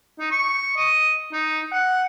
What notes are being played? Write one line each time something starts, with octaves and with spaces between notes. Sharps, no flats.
D#4
C#6
D#5
D#4
F#5